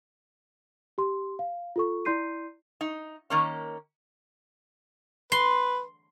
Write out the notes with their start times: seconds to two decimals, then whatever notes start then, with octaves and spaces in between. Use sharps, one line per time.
0.98 G4 C6
1.39 F5
1.76 F4 A4 C#6
2.05 E4 D5 C6 G6 C7 D#7
2.81 D#4
3.30 D#3 A#3 C#4
5.32 B4 C6